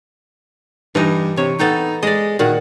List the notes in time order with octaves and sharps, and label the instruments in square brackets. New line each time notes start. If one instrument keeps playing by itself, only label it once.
[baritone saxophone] G2 [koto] E3 D#4
[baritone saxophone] C3 [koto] C#5
[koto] B3 A4 G5 [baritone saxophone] D#4
[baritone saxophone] G#3 [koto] D5 D#5
[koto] A#2 D#3 F#5 [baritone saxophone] F#4